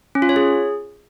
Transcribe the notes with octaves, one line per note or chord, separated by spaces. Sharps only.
C#4
F4
C#5
G#4